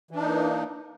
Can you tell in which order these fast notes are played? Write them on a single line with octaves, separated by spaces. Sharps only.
E3 D4 D#4 A#3